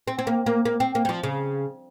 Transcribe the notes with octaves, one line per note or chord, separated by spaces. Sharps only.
C4
C4
A#3
A#3
A#3
C4
A#3
G3
F3
C#3